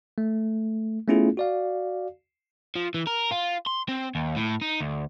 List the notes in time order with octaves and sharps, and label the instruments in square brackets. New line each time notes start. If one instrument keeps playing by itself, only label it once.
[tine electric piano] A3
A3 B3 C#4 E4 F4 G#4
F#4 D5 F5
[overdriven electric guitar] F3
E3
A#4
F4
C6
C4
D#2
A2
D#4
D2